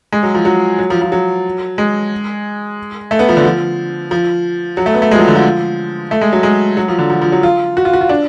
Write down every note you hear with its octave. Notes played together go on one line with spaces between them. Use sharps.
G#3
F#3
F3
F#3
F#3
F3
F3
F#3
G#3
A3
B3
F3
D3
F3
F3
F#3
A3
B3
A3
G#3
F3
F#3
D3
F3
A3
G#3
F#3
G#3
F#3
F3
D3
F3
F3
F#3
F4
F#4
F4
F#4
F4
D4